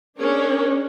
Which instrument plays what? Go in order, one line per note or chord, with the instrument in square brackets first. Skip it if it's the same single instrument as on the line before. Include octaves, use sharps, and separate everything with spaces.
[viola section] C#4 D4 G#4 A#4 C#5